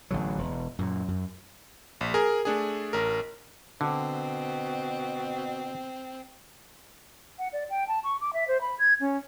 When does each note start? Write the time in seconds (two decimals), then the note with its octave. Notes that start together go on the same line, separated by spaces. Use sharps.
0.11 A1 D3 F#3
0.38 E1
0.79 F#2 A#2
1.08 F#2
2.01 A#1
2.14 G#4 A#4
2.45 A3 D4 G#4
2.93 A1 A#4
3.81 B2 D3 C4
7.39 F#5
7.53 D5
7.70 G5
7.88 A5
8.04 C#6
8.21 D6
8.33 E5
8.48 C5
8.61 B5
8.79 G#6
9.01 C#4